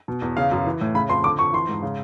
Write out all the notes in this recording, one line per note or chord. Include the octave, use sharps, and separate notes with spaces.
B2
E2
C#3 F5
F#2
E3
A2
C#3 B5
F2 C6
D3 D6
F2 C#6
E3 C6
G#2
C#3